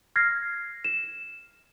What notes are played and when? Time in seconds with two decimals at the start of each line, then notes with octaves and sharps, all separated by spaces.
0.16 F6 G#6 A#6 C7
0.85 E7